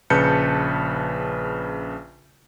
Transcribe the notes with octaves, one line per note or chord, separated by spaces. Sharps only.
A#1 C#3 B4 A5 G6 C#7